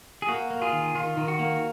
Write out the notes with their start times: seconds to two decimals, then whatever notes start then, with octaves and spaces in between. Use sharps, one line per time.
0.22 G#4
0.29 A#3 F#4
0.50 A#3
0.62 F4 G#4
0.72 D#3
0.95 D#3 F4
1.17 D#3
1.28 F#4
1.39 A#3